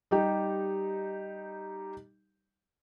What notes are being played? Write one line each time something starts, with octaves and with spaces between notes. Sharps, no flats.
G3 D#4 G4